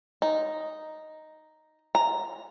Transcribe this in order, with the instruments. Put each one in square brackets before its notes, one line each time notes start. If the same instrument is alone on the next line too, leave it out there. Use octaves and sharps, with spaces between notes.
[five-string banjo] D#4
A#5